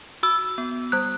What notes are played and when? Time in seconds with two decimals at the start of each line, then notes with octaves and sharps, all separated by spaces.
0.23 F#4 E6
0.58 B3
0.92 G3 F#6